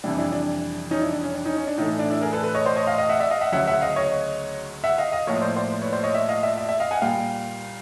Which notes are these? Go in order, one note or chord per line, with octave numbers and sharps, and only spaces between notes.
F2 C3 E3 G3 D4 E4
D4 E4
D4
C#4 D#4
D4 E4
D4
C#4
D4
C#4 D#4
C#4
D4
A2 E3 A3 C#4 D#4
D4
D4 E4
G#4 A#4
A4 B4
A4 B4
C#5 D#5
C5 D5
C#5 D#5
D#5 F5
D#5 F5
E5 F#5
D5 E5
D#5 F5
E5 F#5
D2 C#3 F#3 E5 F#5
E5 F#5
D#5 F5
C#5 D#5
E5 F#5
D#5 F5
D#5 F5
A2 F3 A#3 C#5 D#5
C5 D5
C5 D5
B4 C#5
C5 D5
C#5 D#5
D5 E5
D#5 F5
D5 E5
D5 E5
D5 E5
D#5 F5
F#5 G#5
A#2 G3 A#3 F5 G5